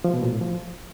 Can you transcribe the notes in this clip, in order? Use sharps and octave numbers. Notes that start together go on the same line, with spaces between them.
F3
B2
A#2
A2
F3